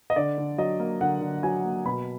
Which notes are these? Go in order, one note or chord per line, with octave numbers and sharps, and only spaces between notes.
D#5
D3 D5
D3
F#3 D#5
A#3
D3 F#5
D3
F#3 G#5
A#3
B2 B5